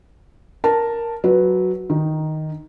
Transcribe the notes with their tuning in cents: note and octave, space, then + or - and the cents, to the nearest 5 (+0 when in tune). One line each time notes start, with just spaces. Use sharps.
A#4 +0 A5 +5
F#3 +0 B4 +0
D#3 +0 D#4 +0